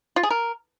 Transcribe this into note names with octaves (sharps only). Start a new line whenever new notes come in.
F4
G#4
A#4